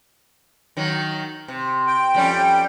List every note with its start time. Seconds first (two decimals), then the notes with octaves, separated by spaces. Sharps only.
0.77 D#3 F#3
1.48 C3
1.87 G5
2.15 F2 G3 C#4